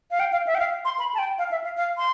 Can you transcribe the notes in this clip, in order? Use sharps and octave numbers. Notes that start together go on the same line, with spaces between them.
F5
G5
F5
E5
G5
F5
C6
B5
A5
G5
F5
E5
F5
F5
C6